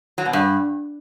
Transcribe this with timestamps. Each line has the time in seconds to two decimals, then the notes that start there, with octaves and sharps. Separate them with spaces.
0.18 F#3
0.26 B2
0.33 G2